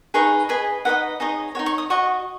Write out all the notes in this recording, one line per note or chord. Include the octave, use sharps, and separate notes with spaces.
D#4 G#4 B4 C#6
G#4 B4 D#5 G#5
D#4 B4 D#5 F#5
D#4 G#4 C#5 D#5
D#4 F#4 C#5
C#6
D#6
F#4 D#5 C#6